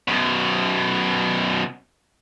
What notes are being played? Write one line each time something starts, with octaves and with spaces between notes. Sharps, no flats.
F#2 B2